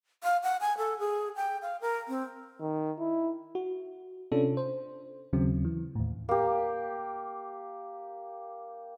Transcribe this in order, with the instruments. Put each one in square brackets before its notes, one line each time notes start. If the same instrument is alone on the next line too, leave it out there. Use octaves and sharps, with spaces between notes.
[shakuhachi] F5
F#5
G#5
A4
G#4
G5
F5
A#4
C4
[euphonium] D#3
E4
[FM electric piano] F#4
C3 C#4 D4 F4 A4
C5
D#2 C#3 F#3 C4
E3
D#2 A2
[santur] A#3 G4